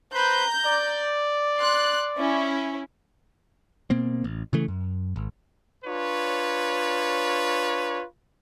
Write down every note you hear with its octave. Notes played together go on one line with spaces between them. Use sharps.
B4 C5 A#5 B5 G6
D5
C6 F#6
C#4 E4
B2 A#3 C4
A1
C#3 E3 A3
F#2
G#1
D4 F4 B4 C#5